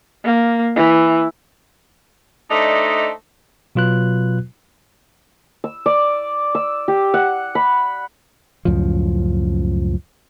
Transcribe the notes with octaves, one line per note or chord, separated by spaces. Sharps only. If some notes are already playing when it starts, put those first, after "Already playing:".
A#3
E3
A3 D4 D#4 C5 D5 D#5
B2 F#3 F4 B4 F#6
E6
D5
E6
G4
F#5
B5
C#2 F#2 A2 F3